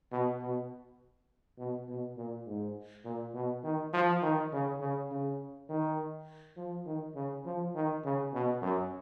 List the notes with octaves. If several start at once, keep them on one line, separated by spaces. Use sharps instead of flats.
B2
B2
B2
B2
A#2
G#2
A#2
B2
D#3
F3
D#3
C#3
C#3
C#3
D#3
F3
D#3
C#3
F3
D#3
C#3
B2
F#2